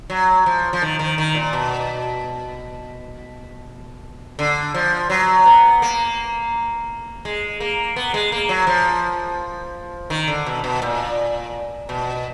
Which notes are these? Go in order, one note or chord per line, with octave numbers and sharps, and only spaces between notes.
F#3
F3
F3
D#3
D#3
D#3
A#2
B2
D3
F3
F#3
B3
A#3
G#3
A#3
B3
G#3
A#3
F#3
F3
D#3
D3
B2
B2
A#2
B2